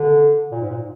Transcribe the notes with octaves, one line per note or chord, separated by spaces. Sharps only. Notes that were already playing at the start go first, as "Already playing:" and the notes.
Already playing: D3
A#2
G#2
A#2